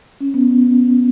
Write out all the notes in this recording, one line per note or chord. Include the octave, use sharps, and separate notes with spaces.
C#4
B3